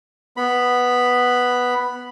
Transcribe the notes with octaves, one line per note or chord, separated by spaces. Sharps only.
B3 B5